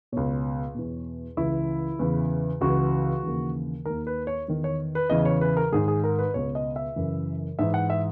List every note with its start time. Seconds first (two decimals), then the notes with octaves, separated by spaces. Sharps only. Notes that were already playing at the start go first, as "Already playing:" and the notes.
0.12 C#2 B2 C#5
0.75 E2 B2
1.37 C#2 C#3 E3 E4
1.99 E2 C#3 E3
2.61 C#2 C#3 E3 F#4
3.23 D#2 C#3 E3
3.85 D#2 D#3 A#4
4.07 B4
4.27 C#5
4.48 E2 D#3
4.64 C#5
4.95 B4
5.10 E2 C#3 E3 D#5
5.25 C#5
5.41 B4
5.57 A#4
5.73 G#2 D#3 G#4
5.88 G#4
6.04 A#4
6.19 B4
6.34 C#2 B2 C#5
6.55 D#5
6.76 E5
6.96 F#2 C#3 E3
7.59 G#2 E3 E5
7.74 F#5
7.90 E5